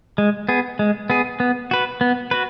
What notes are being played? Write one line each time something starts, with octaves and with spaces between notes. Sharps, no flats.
G#3
B3 G#4
G#3
B3 G#4
B3
F#4 B4
B3
F#4 B4